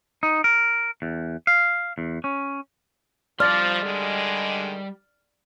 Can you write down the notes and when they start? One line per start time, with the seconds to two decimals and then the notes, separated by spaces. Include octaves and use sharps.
0.23 D#4
0.44 A#4
1.02 E2
1.47 F5
1.98 E2
2.24 C#4
3.40 F3 G3 D5 C6 F6 A6
3.82 D3 D#3 G#3